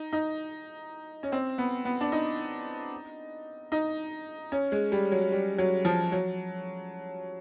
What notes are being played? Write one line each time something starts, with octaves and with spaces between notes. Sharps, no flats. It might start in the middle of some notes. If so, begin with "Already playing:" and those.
Already playing: D#4
D#4
C#4
C4
B3
B3
D4
D#4
D#4
C#4
G#3
G3
F#3
G3
F#3
F3
F#3